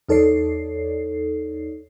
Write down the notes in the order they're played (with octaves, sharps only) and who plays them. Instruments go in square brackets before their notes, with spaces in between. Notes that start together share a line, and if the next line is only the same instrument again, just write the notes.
[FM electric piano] E2 D#4 A4 C#5 D5 C7